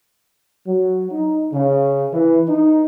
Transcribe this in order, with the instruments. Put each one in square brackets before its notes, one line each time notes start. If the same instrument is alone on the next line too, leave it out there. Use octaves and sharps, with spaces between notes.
[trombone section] F#3
D#4
C#3
E3
D#4